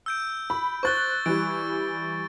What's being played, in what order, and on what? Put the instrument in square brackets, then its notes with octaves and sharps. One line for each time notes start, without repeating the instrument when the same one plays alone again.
[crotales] E6 G6 D7
[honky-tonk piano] B5
[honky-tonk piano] C5 F#6 [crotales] C#6 A6 G7
[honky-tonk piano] E3 G3 [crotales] D7